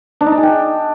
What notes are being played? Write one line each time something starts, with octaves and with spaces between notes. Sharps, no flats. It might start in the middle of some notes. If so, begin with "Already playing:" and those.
D4
D#4
D4
G#4
G5